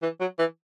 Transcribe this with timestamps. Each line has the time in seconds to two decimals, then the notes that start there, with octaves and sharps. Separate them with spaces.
0.02 E3
0.20 F#3
0.39 E3